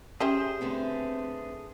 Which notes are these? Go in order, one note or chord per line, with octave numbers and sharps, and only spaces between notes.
C#4 G4 G#4 C5 E5
D3 A3 B3 C4